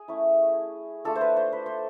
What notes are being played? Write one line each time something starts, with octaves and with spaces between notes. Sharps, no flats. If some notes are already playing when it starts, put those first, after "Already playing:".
Already playing: G#4
A3 C#4 E4
A3 D4 F4 A4
C5
B4
C5
B4
C5